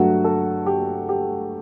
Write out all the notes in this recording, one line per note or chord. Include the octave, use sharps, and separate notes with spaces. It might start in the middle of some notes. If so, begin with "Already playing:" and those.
Already playing: G2 F#3 A3 F#4
A4
G4
G4